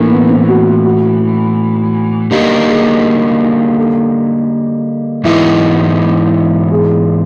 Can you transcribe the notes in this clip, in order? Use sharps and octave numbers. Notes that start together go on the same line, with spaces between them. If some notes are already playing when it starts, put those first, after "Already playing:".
Already playing: A2 E3 A3 A#3 D4 D#4
B3
C4
F#4
F4
F#4
D3 G3 A#3 D#4 G4
G#4
A4
G#2 E3 G#3 B3 D#4 E4
G#4